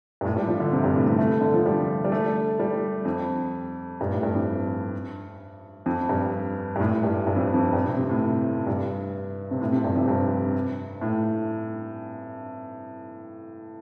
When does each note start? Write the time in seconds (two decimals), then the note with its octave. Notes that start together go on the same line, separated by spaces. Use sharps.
0.21 G2
0.25 A2
0.37 G3
0.48 F3
0.60 D3
0.72 C3
0.84 G2
0.95 A2
1.07 C3
1.19 A3
1.41 D3
1.54 F3
1.66 G3
2.05 G3
2.12 A3
2.59 G3
3.05 F2
4.01 G2
4.10 A2
4.23 G2
4.34 F2
5.86 F2
6.09 G2
6.76 G2
6.80 A2
7.03 G2
7.27 G2
7.36 F2
7.54 F2
7.73 G2
7.86 C3
7.96 C3
8.09 A2
8.67 G2
9.51 C3
9.61 A2
9.72 C3
9.84 G2
9.95 F2
10.08 G2
11.01 A2